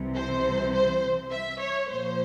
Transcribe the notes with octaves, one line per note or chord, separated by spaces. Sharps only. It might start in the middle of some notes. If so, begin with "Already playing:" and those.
Already playing: C2 C3 E3
C5
C5
E5
C#5
A#2 F3 A#3 C5